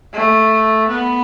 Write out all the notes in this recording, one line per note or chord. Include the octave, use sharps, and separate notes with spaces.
A3
B3